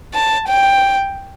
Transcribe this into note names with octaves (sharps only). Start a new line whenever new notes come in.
A5
G5